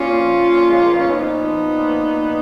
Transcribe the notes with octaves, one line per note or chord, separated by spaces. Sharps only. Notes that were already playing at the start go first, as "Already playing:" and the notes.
Already playing: A#2 C#4 F4
F3
A#2
G#3
A#2 A#3
B3
C#4
F3 B3 D#4
F3
A#2
A#2